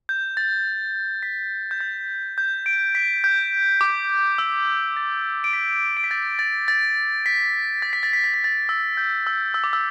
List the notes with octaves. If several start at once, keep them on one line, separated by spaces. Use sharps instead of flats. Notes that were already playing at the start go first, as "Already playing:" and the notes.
G6
A6
B6
G6
A6
G6
D7
B6
G6
D6
E6
A6
D7
B6
D7
B6
A6
A6
A6
B6
A6
B6
A6
B6
A6
B6
A6
E6
G6
E6
E6
D6
E6